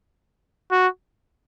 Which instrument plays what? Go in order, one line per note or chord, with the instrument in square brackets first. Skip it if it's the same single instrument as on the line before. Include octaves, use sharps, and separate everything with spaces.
[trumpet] F#4